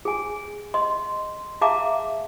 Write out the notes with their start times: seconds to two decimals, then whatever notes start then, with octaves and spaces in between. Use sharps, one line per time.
0.05 G#4 G#5
0.74 D#5 C6
1.61 G#4 E5 F5 A5 A#5 D6